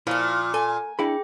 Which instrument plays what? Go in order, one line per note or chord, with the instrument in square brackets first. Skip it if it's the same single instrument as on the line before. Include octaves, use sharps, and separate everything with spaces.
[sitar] A#2 [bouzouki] F3 F4 [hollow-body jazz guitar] E4
[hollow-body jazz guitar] A4 [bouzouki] G#5
[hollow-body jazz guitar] D4 E4 B5 [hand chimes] G#4 G5